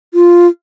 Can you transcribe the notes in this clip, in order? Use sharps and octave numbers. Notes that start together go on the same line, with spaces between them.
F4